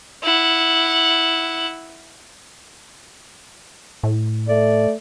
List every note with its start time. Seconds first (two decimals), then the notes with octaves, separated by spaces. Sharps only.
0.23 E4 F#5
4.03 A2
4.48 A3 D5